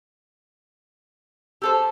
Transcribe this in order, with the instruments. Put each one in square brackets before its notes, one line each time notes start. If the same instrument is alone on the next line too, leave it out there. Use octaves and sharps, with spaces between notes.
[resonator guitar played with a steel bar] G4 A4 C5 [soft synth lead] E6